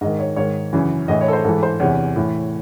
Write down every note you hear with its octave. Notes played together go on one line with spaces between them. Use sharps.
G#2 D#3 D#5
C#5
G#2 D#3 C#5
F#2 C#3 E3
A2 E3 D#5
C#5
A4
C5
G#2 E3 A4
C5
E2 C3 E3 C#5
A2 E3